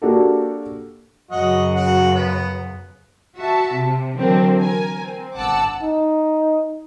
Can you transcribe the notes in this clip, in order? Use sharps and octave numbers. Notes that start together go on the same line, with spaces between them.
A#3 D4 F#4 G4 A4
F#2 C#3 F#4 D#5
F#4
B3
F#4 E5 A5
C3
D3 E3 F#3 C4 D4 A#4
A#4 G#5
C4
G1 F#5 A5 D6 E6
D#4